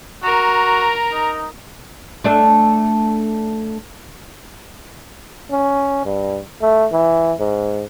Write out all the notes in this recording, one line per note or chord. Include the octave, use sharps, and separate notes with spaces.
F#4 A#4 A#5
D#4
A3 D4 A4
C#4
G2
A3
E3
G#2